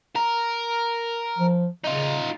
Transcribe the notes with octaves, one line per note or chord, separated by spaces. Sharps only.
A#4
F3
C#3 D#4 F4